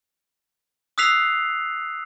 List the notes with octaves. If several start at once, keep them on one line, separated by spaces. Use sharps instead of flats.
D#6 E6 F#6 B6 C7 F7